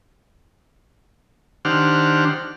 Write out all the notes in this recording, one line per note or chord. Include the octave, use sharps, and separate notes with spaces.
D#3 D4 G4 C5 F#5 F6